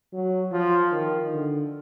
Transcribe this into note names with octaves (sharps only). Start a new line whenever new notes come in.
F#3
F3
D#3
D3